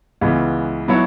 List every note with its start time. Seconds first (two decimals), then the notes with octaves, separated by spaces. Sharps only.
0.21 C#2 C#3 E3 B3
0.88 B2 F#3 B3 E4 C#5